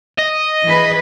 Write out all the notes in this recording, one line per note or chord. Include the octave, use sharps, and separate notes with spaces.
D#5
E3 G#4 B4